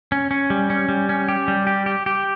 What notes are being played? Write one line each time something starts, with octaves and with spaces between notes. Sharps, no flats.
C#4
C#4
G3
C#4
G3
C#4
G4
G3
G4
G4
G4